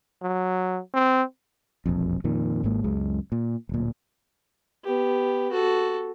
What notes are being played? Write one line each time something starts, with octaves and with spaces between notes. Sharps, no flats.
F#3
C4
E1 A#1 F2
F2 A#2 D#3
G#1 G#2 G#3 A#3
C#2 F#2 G#3
A#2
D1 A#2
B3 G4
F#4 A4